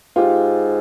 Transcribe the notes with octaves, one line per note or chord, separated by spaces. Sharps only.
G#2 F4 G4